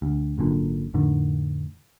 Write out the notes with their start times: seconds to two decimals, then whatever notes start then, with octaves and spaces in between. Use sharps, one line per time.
0.02 D2
0.38 G#1 F#2 A#2 D3
0.94 F2 A2 D3 D#3